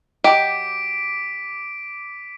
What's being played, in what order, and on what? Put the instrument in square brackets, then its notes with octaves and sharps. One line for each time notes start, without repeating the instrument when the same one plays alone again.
[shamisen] F#3 F#4 D#5 [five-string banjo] G4 [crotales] D6 B6 D7